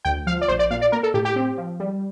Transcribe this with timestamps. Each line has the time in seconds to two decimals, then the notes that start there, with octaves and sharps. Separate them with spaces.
0.05 D2 G5
0.27 F3 F5
0.41 D5
0.48 A#1 C5
0.59 D5
0.70 A#2 F5
0.81 D5
0.92 A#3 A#4
1.03 A4
1.14 A2 G4
1.25 G4
1.36 C4
1.57 F3
1.80 G3